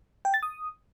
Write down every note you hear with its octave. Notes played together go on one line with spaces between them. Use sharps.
G5
A6
D#6